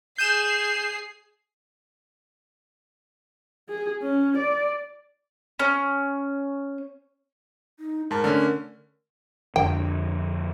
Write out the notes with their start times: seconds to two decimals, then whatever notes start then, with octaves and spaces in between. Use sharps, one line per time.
0.18 G#4 G6 C7 D#7 E7
3.69 G#4
4.02 C#4
4.38 D5
5.59 C#4
7.80 D#4
8.11 G#2 A#4 A5
8.24 D3 A3 C#4
9.56 F2 D3 F3 G5